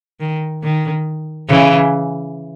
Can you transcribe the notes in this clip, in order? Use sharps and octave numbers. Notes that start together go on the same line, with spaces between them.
D#3
D#3
C#3 E3